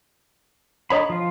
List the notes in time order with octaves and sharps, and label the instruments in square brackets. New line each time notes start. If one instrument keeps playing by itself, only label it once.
[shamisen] D3 C#5 D#5 [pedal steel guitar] D4 A#5 B5
[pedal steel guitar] F3 F4